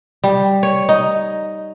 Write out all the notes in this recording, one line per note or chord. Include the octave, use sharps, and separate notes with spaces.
G3
C#5
D#4